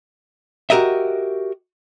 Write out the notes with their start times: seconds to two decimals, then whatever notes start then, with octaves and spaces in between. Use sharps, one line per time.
0.70 F#4 G4 A#4 D#5 E5